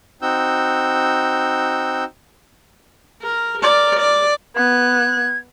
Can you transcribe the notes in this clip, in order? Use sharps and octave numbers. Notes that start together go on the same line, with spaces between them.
C4 D#4 F#4 E6 G6
A#4
A#4 D5
D5
B3 F#6 G#6